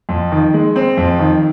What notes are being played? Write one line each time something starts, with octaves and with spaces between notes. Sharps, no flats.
F2
D#3
G#3
C4
F2
D#3